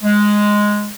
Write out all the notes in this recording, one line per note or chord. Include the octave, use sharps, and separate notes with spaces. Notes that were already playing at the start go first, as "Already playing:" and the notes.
G#3